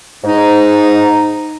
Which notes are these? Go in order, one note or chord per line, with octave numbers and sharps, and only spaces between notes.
G#2 D#4